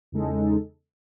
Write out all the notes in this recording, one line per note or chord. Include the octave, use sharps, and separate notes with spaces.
E2 C#3 G#3 D#4 A4